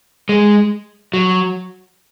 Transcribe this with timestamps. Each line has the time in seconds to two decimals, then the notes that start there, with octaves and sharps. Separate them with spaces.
0.29 G#3
1.14 F#3